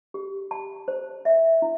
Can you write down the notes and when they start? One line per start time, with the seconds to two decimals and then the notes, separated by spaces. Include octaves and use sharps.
0.14 G4
0.51 A5
0.88 C5
1.25 E5
1.62 E4